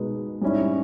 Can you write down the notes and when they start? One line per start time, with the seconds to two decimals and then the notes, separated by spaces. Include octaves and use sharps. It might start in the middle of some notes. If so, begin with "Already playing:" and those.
Already playing: B2 G#3 D#4 G#4 B4
0.42 G#2 G3 C#4 E4